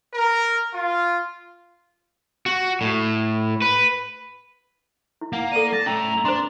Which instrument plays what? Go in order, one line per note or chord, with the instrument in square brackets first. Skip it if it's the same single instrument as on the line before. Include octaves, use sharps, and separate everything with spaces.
[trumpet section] A#4
F4
[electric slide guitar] F#4
A2
B4
[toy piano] E4
[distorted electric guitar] A#3 [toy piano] F#5
[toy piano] A4 D5 [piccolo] D#7
[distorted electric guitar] A5 [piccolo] A#6
[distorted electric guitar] A3 E4 [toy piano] C#4 [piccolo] A#5
[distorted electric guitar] D4 [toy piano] C5 C6